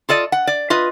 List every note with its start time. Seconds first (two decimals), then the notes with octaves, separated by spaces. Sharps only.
0.09 F4 A4 D5 D#5
0.32 F#5
0.47 D5
0.70 F4 B4 D#5